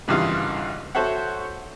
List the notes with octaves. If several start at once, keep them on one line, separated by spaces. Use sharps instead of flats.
G#1 G2 C#3 E3 F4 F5
F#4 A4 C5 C#5 E5 F#5